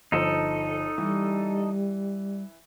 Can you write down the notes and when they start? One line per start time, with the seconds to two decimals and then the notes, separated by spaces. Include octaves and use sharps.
0.12 G1 F3 D#4 A4 C5
0.98 E3 G3